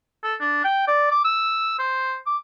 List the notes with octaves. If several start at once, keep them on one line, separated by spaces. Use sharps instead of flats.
A4
D4
G5
D5
D6
E6
C5
D6